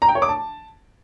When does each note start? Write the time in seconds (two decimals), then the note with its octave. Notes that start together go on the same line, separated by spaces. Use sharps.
0.02 A#5
0.09 G5
0.15 C#5
0.22 D6
0.29 A5